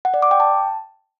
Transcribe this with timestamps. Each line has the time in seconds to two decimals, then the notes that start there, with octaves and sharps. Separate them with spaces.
0.05 F#5
0.14 D5
0.22 D6
0.31 G5
0.40 A5